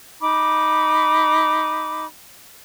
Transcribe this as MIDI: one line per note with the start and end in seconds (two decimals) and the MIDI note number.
0.20 2.05 63
0.20 2.05 83
0.20 2.05 86